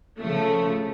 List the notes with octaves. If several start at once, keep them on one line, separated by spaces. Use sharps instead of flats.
C#3 F3 A3